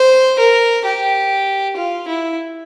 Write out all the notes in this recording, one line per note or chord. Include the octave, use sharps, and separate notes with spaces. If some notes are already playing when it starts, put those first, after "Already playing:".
Already playing: C5
A#4
G4
F4
E4